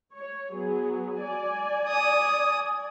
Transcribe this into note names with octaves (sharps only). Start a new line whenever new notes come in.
C#5
F#3 B3 G#4
D5 G#5
D#6